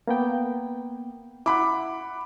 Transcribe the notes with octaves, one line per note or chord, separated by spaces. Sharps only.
A#3 B3 G5
E4 F#5 B5 D6